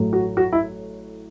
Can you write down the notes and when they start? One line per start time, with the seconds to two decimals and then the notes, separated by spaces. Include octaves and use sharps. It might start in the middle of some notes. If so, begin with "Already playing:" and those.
Already playing: A1 A2 F#3 A3
0.13 F#4
0.37 F#4
0.53 E4